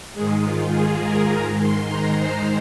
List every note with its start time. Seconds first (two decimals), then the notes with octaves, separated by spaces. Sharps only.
0.14 G#2 D#3 G#3 G#4
0.44 F4
0.73 G#4
1.02 A#4
1.31 G#2 D#3 G#3 A#5
1.60 C6
1.90 A#5
2.18 C5